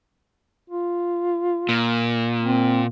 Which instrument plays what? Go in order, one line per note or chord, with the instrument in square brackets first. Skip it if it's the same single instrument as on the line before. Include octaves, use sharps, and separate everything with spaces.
[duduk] F4
[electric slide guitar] A#2
[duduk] C4